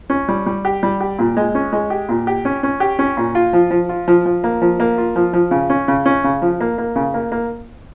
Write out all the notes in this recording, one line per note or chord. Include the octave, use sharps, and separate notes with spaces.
C#4
G3
G3
G4
G3
G4
A#2
G#3
C#4
G#3
G4
A#2
G4
C#4
C#4
G4
C#4
A#2
F4
F3
F3
F4
F3
F3
A#3
F3
A#3
F4
F3
F3
C#3
C#4
C#3
C#4
C#3
F3
A#3
A#3
C#3
A#3
A#3